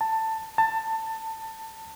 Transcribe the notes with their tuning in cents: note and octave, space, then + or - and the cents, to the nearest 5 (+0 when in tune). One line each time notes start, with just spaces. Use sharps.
A5 +15
A5 +20